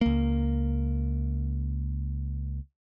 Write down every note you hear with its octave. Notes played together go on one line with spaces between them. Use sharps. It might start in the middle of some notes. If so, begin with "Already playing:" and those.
C#2 A#3